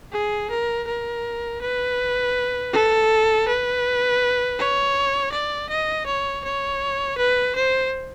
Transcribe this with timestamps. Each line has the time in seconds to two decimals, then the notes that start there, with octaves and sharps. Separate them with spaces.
0.12 G#4
0.50 A#4
0.87 A#4
1.61 B4
2.73 A4
3.48 B4
4.59 C#5
5.32 D5
5.69 D#5
6.06 C#5
6.44 C#5
7.18 B4
7.55 C5